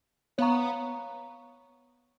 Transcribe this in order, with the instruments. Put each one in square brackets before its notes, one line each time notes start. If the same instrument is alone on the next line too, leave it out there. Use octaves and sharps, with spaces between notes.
[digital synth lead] B3 [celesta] C#5 F5 A#5 C#6